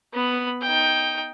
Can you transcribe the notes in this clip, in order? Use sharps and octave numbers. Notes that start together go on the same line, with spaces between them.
B3 B5
D#4 G5